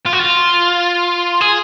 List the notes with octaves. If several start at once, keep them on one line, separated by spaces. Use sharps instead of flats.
F4
F#4
F4
G#4